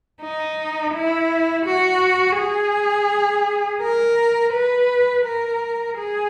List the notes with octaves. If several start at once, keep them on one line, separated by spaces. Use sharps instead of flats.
D#4
E4
F#4
G#4
A#4
B4
A#4
G#4